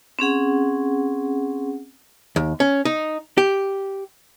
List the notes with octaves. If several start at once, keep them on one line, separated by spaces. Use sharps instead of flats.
C4 C#4 G#4 F#5
D#2
C#4
D#4
G4